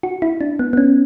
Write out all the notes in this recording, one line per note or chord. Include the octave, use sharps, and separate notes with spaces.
F#4
E4
D4
B3
B3
C#4